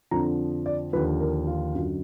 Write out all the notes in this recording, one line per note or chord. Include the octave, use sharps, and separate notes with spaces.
F2 D3 F3 A#5
D5
D#2 D3 F3 B4
A#4
F4
F#2 D3 F#3